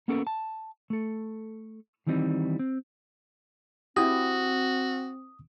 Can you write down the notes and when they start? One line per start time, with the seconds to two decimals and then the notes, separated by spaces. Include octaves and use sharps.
0.08 A#3 B3 C#4 F#4 A4 A#4
0.27 A5
0.90 A3 A4
2.07 D#3 E3 G3 C4 D#4
2.59 C4
3.97 C4 E4 F#4 G4 D#6